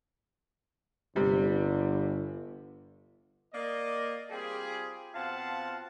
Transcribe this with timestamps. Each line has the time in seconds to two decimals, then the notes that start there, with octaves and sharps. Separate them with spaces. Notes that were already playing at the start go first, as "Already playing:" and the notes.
1.16 G1 C3 G3
3.53 A#3 D5 D#5
4.31 G3 C4 F4 G4 G#4
5.15 B2 C4 F4 F5 F#5 A5